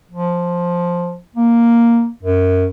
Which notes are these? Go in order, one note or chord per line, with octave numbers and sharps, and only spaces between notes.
F3
A#3
F#2